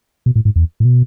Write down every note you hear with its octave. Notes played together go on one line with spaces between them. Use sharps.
B2
A2
G#2
E2
A2
B2